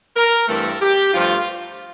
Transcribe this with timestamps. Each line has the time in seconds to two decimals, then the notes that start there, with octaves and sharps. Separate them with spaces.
0.17 A#4
0.48 G2 E3 A3 C4 A4
0.82 G4
1.14 G2 F3 A3 F4